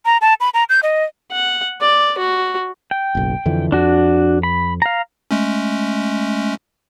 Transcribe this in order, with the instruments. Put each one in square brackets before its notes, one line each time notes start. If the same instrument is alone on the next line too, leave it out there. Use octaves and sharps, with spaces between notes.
[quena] A#5
A5
B5
A#5
G6
D#5
[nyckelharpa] F#5
D5
F#4
[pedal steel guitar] G5
[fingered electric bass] F#1 B1
F2 D3 E3
[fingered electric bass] F2 [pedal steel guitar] D4 F#4
[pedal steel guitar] B5
F5 A#5
[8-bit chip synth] G#3 A3 C#4